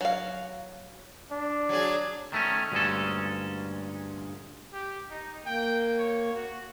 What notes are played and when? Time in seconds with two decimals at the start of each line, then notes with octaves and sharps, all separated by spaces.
0.01 F#3 F5
1.31 D4
1.69 F#3 G#4
2.32 D#3 A3 C#4
2.72 D2 G2 A#2 G#3 C#4 A4
4.73 G4
5.10 D#4
5.46 A#3 G5
5.98 C#5
6.35 F#4